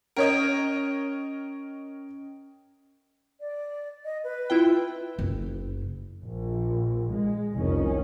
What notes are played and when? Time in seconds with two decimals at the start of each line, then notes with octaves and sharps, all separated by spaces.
0.16 C#4 A#4 C#5 D#5 G5 D7
3.40 D5
4.05 D#5
4.24 B4
4.50 E4 F4 G5
5.19 F#1
6.22 A#1
7.13 G#3
7.53 F1 C2 F2 D#3 C#4